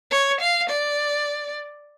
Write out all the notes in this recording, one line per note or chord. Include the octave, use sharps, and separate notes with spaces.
C#5
F5
D5